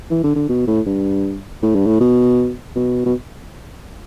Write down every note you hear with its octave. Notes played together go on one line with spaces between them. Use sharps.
E3
D3
D3
B2
A2
G2
A2
G2
A2
B2
B2
B2